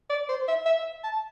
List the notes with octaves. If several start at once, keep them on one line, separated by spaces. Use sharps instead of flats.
D5
C5
E5
E5
A5